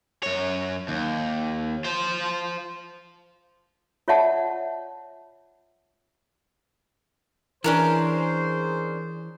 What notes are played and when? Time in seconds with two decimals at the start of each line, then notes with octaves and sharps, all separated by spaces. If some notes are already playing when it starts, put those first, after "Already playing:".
0.23 F#2 C#5
0.88 D#2
1.84 F4 C5
4.08 F4 C#5 D5 E5 F#5 A5
7.64 E3 C#4 D4 G#4 A#4 C5